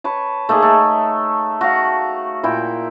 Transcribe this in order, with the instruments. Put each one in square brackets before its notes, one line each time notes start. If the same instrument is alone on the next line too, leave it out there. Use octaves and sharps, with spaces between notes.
[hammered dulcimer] B4 C#5 A5
A3 A#3 D#4 G#4
A3
F#4 F5
A#2 E4 G5